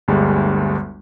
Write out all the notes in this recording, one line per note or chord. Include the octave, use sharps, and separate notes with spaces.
G1 D2 G3 G#3